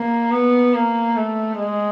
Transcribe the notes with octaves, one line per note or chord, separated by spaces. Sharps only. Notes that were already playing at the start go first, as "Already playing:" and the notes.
Already playing: A#3
B3
A#3
A3
G#3